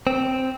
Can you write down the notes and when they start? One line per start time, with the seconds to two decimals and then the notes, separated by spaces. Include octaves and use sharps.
0.07 C4